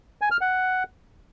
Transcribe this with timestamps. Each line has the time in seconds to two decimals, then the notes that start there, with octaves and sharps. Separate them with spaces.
0.21 G#5
0.31 F6
0.41 F#5